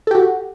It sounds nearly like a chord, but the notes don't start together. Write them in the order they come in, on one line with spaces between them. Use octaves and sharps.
A4 G4 F#4